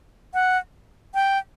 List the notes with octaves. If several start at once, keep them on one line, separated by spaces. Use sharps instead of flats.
F#5
G5